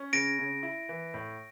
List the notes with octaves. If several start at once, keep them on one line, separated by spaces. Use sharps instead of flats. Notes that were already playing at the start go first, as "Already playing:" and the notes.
Already playing: C#4
C#3 A#6 D7
C#3
E4
E3
A2